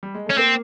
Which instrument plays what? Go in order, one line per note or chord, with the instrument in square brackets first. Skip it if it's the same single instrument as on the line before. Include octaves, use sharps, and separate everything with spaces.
[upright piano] G3
G#3
[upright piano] A3 [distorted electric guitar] C#4
[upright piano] A#3 [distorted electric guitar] C4